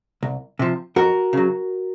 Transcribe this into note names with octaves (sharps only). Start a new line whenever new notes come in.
C2
C3 F3
F2 F#4 A#4
C#3 F#3